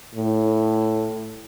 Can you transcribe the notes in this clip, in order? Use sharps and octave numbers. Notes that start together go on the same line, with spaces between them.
A2